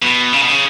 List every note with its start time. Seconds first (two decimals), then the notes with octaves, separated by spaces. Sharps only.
0.02 B2
0.33 C#3
0.41 B2
0.49 C#3